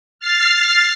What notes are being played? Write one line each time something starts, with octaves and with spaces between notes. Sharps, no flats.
F6 A6 C7